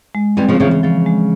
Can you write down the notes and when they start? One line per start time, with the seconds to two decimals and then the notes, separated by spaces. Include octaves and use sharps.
0.15 G#3
0.37 E3 G3 C4
0.48 C#3 F3
0.60 C#3 E3 F3
0.71 C#3
0.83 C#3 F3
1.06 G#3